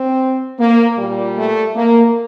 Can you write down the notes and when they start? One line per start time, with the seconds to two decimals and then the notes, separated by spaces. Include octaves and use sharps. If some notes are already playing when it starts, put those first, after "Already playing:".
Already playing: C4
0.59 A#3
0.97 A#2 G3
1.37 A3
1.75 A#3